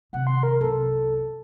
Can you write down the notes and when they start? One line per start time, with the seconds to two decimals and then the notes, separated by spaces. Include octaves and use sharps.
0.13 C3 D#3 F#5
0.27 C6
0.43 A#4
0.61 C2 F#2 A4